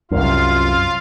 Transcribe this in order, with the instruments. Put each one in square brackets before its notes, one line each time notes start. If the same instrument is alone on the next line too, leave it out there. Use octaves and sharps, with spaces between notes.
[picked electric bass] C2 F#2 [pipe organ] F4 F5